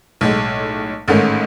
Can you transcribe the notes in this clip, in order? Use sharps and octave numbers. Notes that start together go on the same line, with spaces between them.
B1 A2 G#3
A1 G#2 D#3 A3 C#4